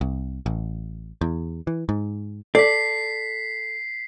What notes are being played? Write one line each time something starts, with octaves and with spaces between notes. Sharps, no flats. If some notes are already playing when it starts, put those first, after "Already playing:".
C2
A1
E2
E3
G#2
A4 D5 B6 C7